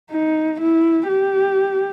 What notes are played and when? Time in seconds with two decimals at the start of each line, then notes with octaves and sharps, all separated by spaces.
0.11 D#4
0.60 E4
1.08 G4